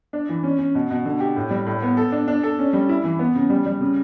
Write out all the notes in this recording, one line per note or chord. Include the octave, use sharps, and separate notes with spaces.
D4
E3
C#4
C#4
B2
B2
D3
G4
A2
G3
A2
B3
A4
D4
D4
A4
C#4
G3
E4
E3
B3
C#3
G3
G3
C#3